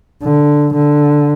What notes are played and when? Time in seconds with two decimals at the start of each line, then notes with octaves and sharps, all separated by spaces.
0.23 D3
0.75 D3